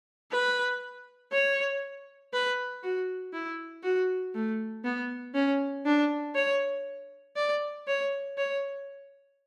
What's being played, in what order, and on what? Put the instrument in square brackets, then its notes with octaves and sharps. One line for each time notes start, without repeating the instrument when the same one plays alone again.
[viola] B4
C#5
B4
F#4
E4
F#4
A3
B3
C#4
D4
C#5
D5
C#5
C#5